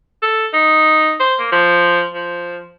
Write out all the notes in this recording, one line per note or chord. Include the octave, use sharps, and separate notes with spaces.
A4
D#4
C5
A#3
F3
F3